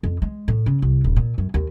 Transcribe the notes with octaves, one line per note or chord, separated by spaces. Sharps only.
F2
G#3
A2
C#3
C2
D#1
A#2
F#2
D#2